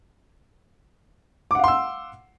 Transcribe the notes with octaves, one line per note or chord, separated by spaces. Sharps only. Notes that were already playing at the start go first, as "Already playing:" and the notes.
F5 F#5 C6 D6 E6